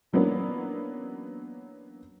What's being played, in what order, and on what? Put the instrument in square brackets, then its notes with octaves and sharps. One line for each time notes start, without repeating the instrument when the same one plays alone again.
[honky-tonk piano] E3 F#3 A#3 B3 C#4 D4